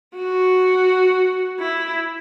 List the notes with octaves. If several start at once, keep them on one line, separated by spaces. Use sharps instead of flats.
F#4
E4